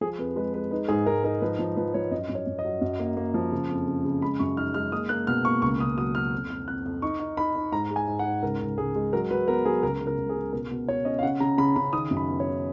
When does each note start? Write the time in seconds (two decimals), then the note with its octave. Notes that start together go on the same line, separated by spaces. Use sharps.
0.01 F3 G#4
0.19 F2 B4
0.36 G#3 B4
0.54 G#3 B4
0.71 D#4 B4
0.88 G#2 G#4
1.06 G#2 A#4
1.24 D#4 A#4
1.42 F3 B4
1.59 F3
1.76 F3 B4
1.94 F3 C#5
2.11 F#2 D#5
2.29 F#2
2.35 C#5
2.47 F#2
2.59 D#5
2.65 F#3
2.81 F#2
2.99 A#3
3.17 A#3
3.34 F3
3.52 C#3
3.69 F2
3.87 C#3
4.04 C#3
4.22 G#3 B5
4.39 F#2 C#6
4.57 D#4 F6
4.74 G#3 F6
4.92 A#3 D#6
5.09 A#3 F#6
5.27 B2 F6
5.45 A#3 C#6
5.62 C#2 C#6
5.80 C#2 D#6
5.97 F#3 D#6
6.15 F#3 F6
6.33 F2
6.50 F2 F6
6.67 F2 F#6
6.86 F2
7.02 D#4 C#6
7.20 D#4
7.37 D#4 B5
7.56 D#4
7.72 G#2 A#5
7.90 G#3
7.96 G#5
8.08 G#2
8.19 F#5
8.25 G#2
8.42 C#2 A#4
8.60 C#2
8.77 C#2 G#4
8.95 G#3
9.13 F#3 A#4
9.31 F#3 B4
9.48 B3 A#4
9.65 F#3 G#4
9.83 C#2 A#4
10.00 C#2
10.07 A#4
10.18 C#2
10.29 G#4
10.36 C#3
10.53 B2 A#4
10.71 B2
10.88 B2 C#5
11.05 C#4 D#5
11.19 F5
11.23 C#3 F#5
11.40 C#3 A#5
11.58 C#3 B5
11.76 C#3 B5
11.93 D#3 D#6
12.11 F#2
12.17 B5
12.28 B3
12.40 C#5
12.46 D#3